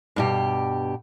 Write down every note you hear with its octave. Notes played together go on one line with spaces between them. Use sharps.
G2 B2 G4